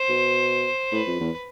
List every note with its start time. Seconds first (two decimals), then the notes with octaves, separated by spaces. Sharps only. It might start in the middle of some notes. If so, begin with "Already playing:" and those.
Already playing: C5
0.09 B2
0.92 A2 B4
1.07 F2
1.20 E2